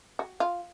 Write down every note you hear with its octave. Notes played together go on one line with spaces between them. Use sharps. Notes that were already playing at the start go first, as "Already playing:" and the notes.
F#4
F4